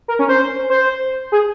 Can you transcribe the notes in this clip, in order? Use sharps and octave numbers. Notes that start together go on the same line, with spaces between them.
A#4
C#4
C5
C5
G#4